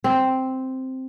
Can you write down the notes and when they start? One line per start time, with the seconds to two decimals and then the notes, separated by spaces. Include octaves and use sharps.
0.04 C4